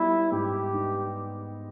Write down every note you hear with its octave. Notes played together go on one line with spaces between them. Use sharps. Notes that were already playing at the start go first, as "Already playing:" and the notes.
Already playing: G3 B3 E4
G#2 G4
D#4